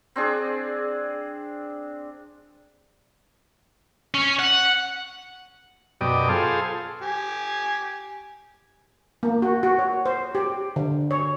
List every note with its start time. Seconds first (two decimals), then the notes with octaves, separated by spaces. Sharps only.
0.16 C4 D4 G#4
4.14 C#4
4.39 F#5
6.01 F#2 B2 G4 D5 D#5
6.29 F4 G#4 A4 C5
7.01 G4 G#5
9.23 A#3
9.42 F#4
9.63 F#4
9.79 C#5
10.06 C5
10.35 G4
10.76 D3
11.11 C#5